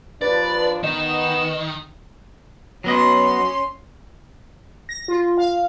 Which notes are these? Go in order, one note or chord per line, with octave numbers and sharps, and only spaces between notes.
D#2 F3 D4 B4 D5 A6
D#3 B3 D#4 D#5 E7
F#3 B3 C#4 D#5 C6
A#6
F4
F5